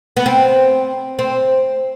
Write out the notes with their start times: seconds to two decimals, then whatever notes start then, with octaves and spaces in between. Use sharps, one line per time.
0.17 B3
0.26 C4
1.19 C4